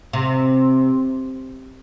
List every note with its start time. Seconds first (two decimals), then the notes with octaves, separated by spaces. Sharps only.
0.13 C3